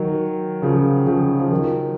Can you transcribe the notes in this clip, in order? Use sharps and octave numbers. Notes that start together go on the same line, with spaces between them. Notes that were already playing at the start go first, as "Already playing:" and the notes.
Already playing: D#3 F#3
C#3 F3
C#3 F3
F3
D#3 F#3